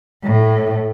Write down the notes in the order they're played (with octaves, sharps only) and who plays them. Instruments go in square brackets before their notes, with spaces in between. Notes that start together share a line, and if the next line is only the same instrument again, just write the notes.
[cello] A2